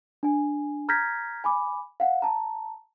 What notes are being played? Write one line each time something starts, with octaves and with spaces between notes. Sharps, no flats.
D4 G#5
A#5 F6 G6 G#6 A#6 B6
G#5 B5 D6
F5 F#5
A5 A#5